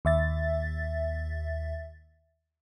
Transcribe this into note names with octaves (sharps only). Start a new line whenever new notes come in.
D#2 E5 A6